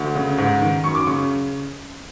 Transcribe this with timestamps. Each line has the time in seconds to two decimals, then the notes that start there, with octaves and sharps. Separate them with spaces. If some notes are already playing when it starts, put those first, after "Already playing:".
Already playing: D2
0.15 C#3
0.38 G#2
0.61 D#3
0.84 F#2 C#6
0.95 D6
1.07 C#3 C#6